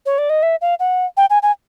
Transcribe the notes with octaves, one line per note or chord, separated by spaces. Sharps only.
C#5
D5
D#5
E5
F5
F#5
G5
G#5
G#5